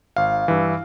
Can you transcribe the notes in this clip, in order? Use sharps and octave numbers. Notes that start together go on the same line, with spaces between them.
G#1 F5
G2 E3